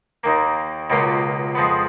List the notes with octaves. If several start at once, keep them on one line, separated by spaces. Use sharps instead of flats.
D#2 D#3 A#3
C#2 B2 A#3 C#4 F4
F2 F3 G#3 B3